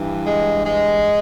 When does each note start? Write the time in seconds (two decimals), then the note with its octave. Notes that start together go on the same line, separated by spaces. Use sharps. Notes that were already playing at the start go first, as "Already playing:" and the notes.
Already playing: G2 E3
0.25 G#3
0.65 G#3